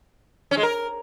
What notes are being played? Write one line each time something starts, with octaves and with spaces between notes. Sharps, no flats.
C#4
G#3
A#4